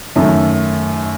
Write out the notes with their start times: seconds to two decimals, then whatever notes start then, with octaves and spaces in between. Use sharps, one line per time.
0.16 F#2 D#3 A3